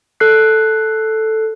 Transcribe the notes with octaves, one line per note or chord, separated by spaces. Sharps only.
A4 F#6 C7